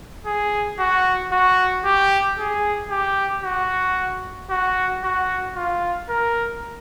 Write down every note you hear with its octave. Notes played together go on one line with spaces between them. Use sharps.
G#4
F#4
F#4
G4
G#4
G4
F#4
F#4
F#4
F4
A#4